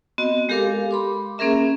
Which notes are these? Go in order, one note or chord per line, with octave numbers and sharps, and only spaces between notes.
B3 C4 F#4 D#5
G#3 G4 A4 A#4 F5 D6
B5 C6 D6
A#3 C#4 G#4 A#4 E5 A#5